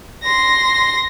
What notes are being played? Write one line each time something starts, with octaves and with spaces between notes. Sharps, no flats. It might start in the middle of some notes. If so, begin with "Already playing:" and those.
C6 A#6